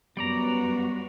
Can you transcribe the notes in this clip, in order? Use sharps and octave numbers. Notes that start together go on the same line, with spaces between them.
F#2 G3 B3 F#4 D5 A#5